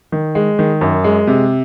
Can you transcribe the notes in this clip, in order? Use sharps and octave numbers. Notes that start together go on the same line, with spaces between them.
D#3
G#3
D#3
F#2
G#3
C3